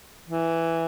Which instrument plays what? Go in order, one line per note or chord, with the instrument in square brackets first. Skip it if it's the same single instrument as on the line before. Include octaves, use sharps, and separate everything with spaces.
[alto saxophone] E3